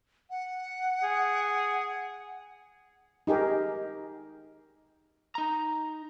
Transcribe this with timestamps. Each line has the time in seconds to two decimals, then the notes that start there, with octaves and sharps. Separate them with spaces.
0.30 F#5
1.03 G#4
3.27 D#4 G4 G#4 A#4
5.35 D#4 A#5